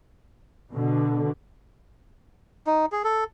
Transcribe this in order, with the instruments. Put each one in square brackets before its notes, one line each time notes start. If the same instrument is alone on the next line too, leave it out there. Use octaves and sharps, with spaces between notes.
[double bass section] B2 D3
[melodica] D#4
G#4
A4